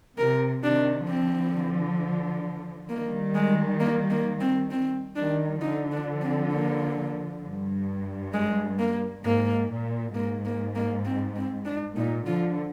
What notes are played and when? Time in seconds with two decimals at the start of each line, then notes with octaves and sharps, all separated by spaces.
0.18 C3 A#4
0.63 C3 D#3 D4
1.08 D3 F3 C4
2.89 D#3 G3 A#3
3.35 G#3
3.80 A#3
4.10 A#3
4.40 C4
4.71 C4
5.16 D#3 G3 D4
5.61 D3 F3 D#4
5.92 D4
6.22 C4
6.52 A#3
7.43 G2
8.33 G#3
8.79 A#3
9.24 G#2 A#3
9.69 A#2
10.15 G#2 A#3
10.45 A#3
10.75 A#3
11.05 C4
11.36 C4
11.65 D4
11.96 A#2 D#4
12.26 D3 F3 F4